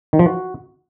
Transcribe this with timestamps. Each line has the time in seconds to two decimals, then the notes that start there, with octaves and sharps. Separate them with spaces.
0.13 D#3
0.19 F3
0.26 F#4